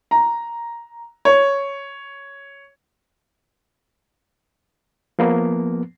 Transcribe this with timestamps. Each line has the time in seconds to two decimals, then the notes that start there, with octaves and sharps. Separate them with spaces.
0.11 A#5
1.25 C#5
5.19 F3 A#3 B3